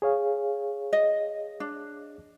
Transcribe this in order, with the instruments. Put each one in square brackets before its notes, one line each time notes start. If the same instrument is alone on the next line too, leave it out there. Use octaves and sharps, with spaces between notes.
[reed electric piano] G#4 C#5 F5
[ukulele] D#5
D4